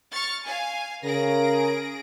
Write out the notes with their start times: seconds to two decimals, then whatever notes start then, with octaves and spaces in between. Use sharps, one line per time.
0.11 C#6 F6 A6
0.44 F5 G#5
1.03 C#3 G#4 A#4 A#6 D7